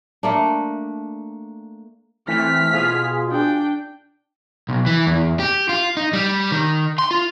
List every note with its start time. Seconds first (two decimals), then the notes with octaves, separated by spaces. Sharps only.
0.23 A3 A#3 D4
2.28 E3 A3 C4 F6 B6
2.72 B2 F4 G#4
3.30 D4 G5
4.69 B1
4.86 E3
5.06 E2
5.40 G4
5.69 F4
5.97 D#4
6.13 G3
6.52 D#3
6.99 C6
7.11 F4